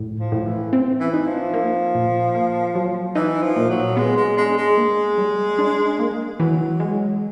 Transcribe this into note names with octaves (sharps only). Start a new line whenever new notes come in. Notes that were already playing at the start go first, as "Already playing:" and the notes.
Already playing: A2
F3
A2
E3
C4
E3
D#4
F3
A#3
A#2
A#3
F#3
E3 D#4
F3
A#2
F#3
G#3 B3
G#3
G#3 D4
G#3
A#3
G3
D4
A#3
E3 F#3
G#3